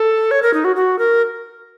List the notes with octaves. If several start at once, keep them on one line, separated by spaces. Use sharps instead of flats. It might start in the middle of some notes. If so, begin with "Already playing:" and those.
Already playing: A4
C#5
A#4
D#4
F#4
F#4
A#4